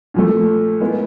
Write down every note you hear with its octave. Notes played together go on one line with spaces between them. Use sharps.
A#2 F3 A3
G#3 B3 E4